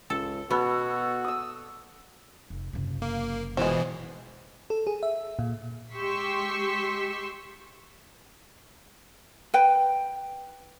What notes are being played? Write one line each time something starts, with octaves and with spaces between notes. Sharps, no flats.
C#2 A4
B2 B3 F#4 A4 C#5
D#6 E6
F1
F#1 C3
A#3
B2 E3 F3 G#3
A4
G#4
E5
A#2
G#3 G4 C6 C#6 E6 B6
B4 G5